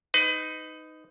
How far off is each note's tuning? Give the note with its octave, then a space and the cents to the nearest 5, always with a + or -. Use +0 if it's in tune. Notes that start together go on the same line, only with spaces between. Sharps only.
D#4 +0 B4 +30